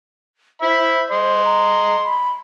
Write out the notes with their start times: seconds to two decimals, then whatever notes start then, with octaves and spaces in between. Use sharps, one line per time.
0.62 C5 E5 B5
1.10 D#5 C6
1.45 A#5
2.04 B5